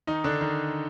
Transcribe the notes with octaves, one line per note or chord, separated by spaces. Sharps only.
D#3 D#4
D3 D4
D#3